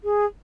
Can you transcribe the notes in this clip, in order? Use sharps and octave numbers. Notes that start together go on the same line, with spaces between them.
G#4